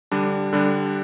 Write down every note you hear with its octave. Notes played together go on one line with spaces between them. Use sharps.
D3 G3 D4
D3 G3 D4